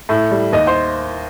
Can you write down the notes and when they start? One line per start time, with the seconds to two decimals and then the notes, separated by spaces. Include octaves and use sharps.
0.09 A2
0.31 G3
0.52 D#2 D#5
0.67 C5